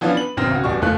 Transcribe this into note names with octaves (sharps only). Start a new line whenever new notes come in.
E3 F3 B3 C#4 D4 F4
B4 F#7
G#1 F#2 B2 C4 F6 A#6
C#2 F#4
D1 A1 G3 F#4 C#6
F#1 A3 F4 F#6